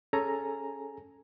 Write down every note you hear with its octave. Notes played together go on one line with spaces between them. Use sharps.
C#4 G#4 A4 G#5 A#5